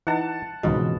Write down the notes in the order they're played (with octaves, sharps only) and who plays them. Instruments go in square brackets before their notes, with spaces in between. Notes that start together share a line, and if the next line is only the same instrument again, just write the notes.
[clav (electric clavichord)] E3 D#4 [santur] F#5 A5
[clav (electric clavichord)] C#2 G#2 G#3 [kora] B2 [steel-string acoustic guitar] E3 F3 C4